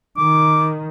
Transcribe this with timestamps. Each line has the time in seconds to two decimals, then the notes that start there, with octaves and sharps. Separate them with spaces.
0.17 D#3 D6